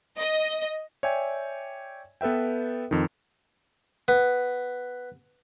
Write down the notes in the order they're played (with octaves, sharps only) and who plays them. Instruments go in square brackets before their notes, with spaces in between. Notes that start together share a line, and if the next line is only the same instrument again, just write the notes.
[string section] D#5
[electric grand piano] C#5 D5 E5 G5 G#5 G#6
B3 A4 B4 E5 G5
F2 D#3
[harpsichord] B3